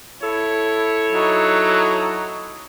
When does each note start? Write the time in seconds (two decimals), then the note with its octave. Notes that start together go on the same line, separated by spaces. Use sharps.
0.22 E4 A4 C#5
1.11 F#3 D#4